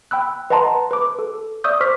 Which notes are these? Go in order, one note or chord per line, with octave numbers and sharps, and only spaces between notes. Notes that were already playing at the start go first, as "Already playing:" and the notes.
G5 B5 E6 F#6
B4 D#5 F#5 A5 A#5 C6
B4 D6
A4
D5 E5 C#6 D#6 E6 G6
C5 C#6 D6 F6 B6